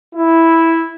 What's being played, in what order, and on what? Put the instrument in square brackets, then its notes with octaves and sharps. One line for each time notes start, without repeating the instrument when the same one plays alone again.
[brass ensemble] E4